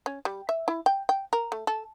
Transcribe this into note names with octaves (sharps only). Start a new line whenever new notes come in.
C#4
G3
E5
E4
G5
G5
A#4
A3
A4